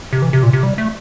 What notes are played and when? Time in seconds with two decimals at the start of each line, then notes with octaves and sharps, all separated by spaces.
0.13 C3
0.22 E3
0.33 C3
0.43 A#2
0.53 C3
0.63 G3
0.78 A3